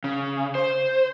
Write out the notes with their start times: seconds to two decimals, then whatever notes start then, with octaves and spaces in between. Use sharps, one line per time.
0.04 C#3
0.55 C5